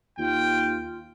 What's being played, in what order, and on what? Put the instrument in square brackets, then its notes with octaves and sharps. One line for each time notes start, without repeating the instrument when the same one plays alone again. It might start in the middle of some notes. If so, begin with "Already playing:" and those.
[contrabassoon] D#2 [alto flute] F4 [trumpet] G5